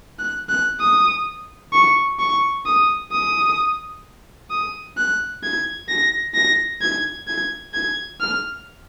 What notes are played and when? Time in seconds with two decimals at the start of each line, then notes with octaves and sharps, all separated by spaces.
0.19 F#6
0.49 F#6
0.80 D#6
1.73 C#6
2.19 C#6
2.66 D#6
3.12 D#6
4.50 D#6
4.97 F#6
5.43 G#6
5.89 A#6
6.34 A#6
6.81 G#6
7.28 G#6
7.74 G#6
8.20 F6